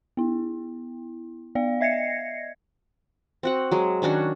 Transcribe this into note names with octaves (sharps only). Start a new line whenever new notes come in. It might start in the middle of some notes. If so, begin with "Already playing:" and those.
B3 E4
B3 D5 F5
D#5 E5 G#6 A#6 C7 C#7
C4 F#4 F#5
F#3 G#3
D#3 C#4 D4 F#4